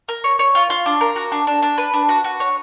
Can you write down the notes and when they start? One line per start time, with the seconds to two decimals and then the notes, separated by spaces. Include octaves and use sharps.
0.09 A#4
0.24 C#5
0.39 C#5
0.55 F4
0.70 F4
0.86 D4
1.01 A#4
1.16 F#4
1.32 D4
1.47 D4
1.62 D4
1.78 B4
1.94 D4
2.09 F#4
2.24 F#4
2.40 C#5